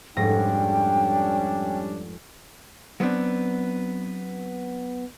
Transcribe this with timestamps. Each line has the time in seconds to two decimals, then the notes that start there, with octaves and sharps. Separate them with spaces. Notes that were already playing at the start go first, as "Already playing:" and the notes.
0.16 F1 G#2 G3 C#4 D4 G5 A#6
3.00 F#3 B3 C4 D4